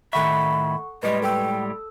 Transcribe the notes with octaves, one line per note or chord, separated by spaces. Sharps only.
A2 D#3 A4 E5 F#5 B5 C#6
A2 G3 G#3 B4 D#5
A4 G5 E6